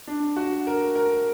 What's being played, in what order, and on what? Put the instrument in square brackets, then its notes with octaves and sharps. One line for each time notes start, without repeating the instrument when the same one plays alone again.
[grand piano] D4
F#4
A#4
A#4